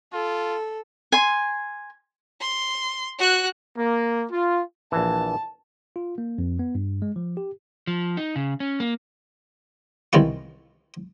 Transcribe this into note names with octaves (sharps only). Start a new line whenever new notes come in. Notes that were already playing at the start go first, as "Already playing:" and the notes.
F4 A4
G#5 C6
C6
F#4 F#6
A#3
F4
A#1 E3 A5
F4
A#3
F2
B3
G2
G#3
F3
G4
F3
D#4
C#3
C#4
A#3
C2 D#3 E3 E4 F4 C#6